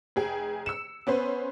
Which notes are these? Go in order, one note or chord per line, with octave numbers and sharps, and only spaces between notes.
F1 G#4 G5
E6 C#7 E7
B3 C#4 B4 C5